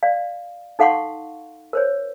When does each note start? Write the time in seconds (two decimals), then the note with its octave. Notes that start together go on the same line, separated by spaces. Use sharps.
0.03 D5 F5
0.79 D#4 A4 F5 F#5 C6 C#6
1.73 A#4 C5 C#5